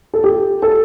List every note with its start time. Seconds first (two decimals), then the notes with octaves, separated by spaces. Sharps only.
0.14 A4
0.24 G4
0.62 A4